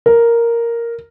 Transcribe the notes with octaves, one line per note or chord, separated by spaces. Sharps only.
A#4